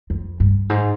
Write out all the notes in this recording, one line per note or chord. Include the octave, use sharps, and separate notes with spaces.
F2
G2
G#2